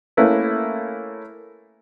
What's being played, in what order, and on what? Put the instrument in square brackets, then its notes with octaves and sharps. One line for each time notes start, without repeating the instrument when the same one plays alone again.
[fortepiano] A3 A#3 C#4 E4 B4